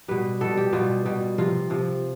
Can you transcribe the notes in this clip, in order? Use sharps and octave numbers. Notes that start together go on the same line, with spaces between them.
B2 G3 B4
B2 G3 A4
G4
B2 G3 F4
B2 G3
C3 F3 F4
C3 F3